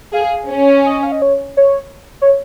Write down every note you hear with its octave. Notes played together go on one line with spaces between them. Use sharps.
G#4 F5
C#4
D#5
F5
D#5
C#5
C#5
C#5